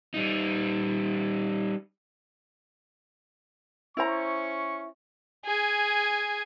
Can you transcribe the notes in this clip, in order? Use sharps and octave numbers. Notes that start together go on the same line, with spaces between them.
G3 D#4
C#4 E4 C5 A#5 C#6
G#4 G#5